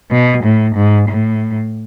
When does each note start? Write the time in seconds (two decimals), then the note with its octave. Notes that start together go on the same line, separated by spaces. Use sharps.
0.11 B2
0.44 A2
0.75 G#2
1.08 A2